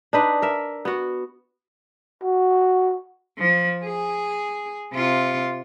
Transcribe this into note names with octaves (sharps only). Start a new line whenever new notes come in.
D4 D#4 B4
A#4 E5
B3 F#4
F#4
F3
G#4
C3 F4